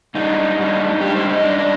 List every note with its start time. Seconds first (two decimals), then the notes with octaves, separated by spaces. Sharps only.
0.15 G#2 G3 D4 D#4
0.58 G#2 G3 D4
1.01 G#2 G3 D4 G4
1.15 C5
1.29 D#5
1.43 G#2 G3 D4 D5
1.58 D5